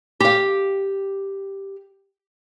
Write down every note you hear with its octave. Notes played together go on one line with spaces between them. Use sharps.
G4 F5